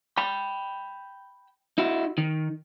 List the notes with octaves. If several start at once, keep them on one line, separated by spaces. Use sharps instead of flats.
G5 B5
D#4 E4 F#4
D#3